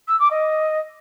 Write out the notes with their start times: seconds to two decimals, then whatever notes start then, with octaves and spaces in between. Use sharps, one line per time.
0.08 E6
0.19 D6
0.31 D#5